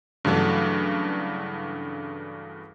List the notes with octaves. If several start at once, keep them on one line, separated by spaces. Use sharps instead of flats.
G2 C#3 E3 F#3 A3 D4